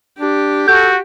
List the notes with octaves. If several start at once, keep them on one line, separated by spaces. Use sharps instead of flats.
D4 G4
F#4 A4 G6